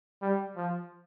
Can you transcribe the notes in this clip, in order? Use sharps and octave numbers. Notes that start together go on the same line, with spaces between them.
G3
F3